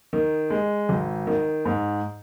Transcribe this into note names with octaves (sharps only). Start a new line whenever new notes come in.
D#3
G#3
G#1
D#3
G#2